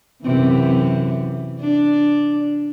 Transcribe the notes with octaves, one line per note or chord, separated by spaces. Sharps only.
F#2 C3 E3
D4